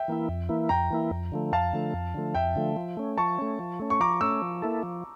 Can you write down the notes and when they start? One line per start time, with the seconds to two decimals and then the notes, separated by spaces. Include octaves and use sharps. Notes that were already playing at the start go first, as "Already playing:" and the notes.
Already playing: E5 G5
0.08 E3 A#3 E4
0.29 F2
0.49 E3 A#3 E4
0.69 F2 G5 A#5
0.91 E3 A#3 E4
1.11 F2
1.32 D3 F3 A3
1.52 F2 F5 A5
1.73 D3 F3 A3
1.94 F2
2.14 D3 F3 A3
2.35 F2 E5 G5
2.56 D3 F3 A3
2.76 F3
2.97 A3 C#4
3.18 F3 A5 C#6
3.39 A3 C#4
3.59 F3
3.79 A3 C#4
3.90 C#6
4.00 F3 A#5 D6
4.21 A3 C#4 C#6 E6
4.42 F3
4.62 A#3 E4 A4
4.83 F3